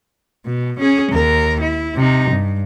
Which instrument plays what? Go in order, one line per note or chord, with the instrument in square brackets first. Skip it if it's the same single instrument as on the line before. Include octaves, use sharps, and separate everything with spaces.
[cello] B2
C#4 G#4
D#2 A#4
E4
C3 D#4
G2